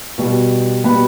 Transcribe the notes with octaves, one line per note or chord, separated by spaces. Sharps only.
B2 G3 B3
B2 G3 B3 B5